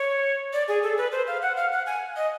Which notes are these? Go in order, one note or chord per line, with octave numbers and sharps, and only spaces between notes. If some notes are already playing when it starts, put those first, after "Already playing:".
Already playing: C#5
D5
G#4
A4
B4
C5
F5
F#5
F5
F#5
G#5
D#5